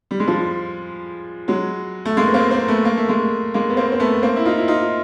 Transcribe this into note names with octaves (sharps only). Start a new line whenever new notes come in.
G3
G#3
F3 G3
F#3 G#3
A3
G#3 A#3
B3
A#3 C4
A#3 C4
A3 B3
A#3
A3
G#3 A#3
G#3 A#3
B3
A#3 C4
C4
A3 B3
A#3 C4
E4
D#4 F4
E4
D#4 F4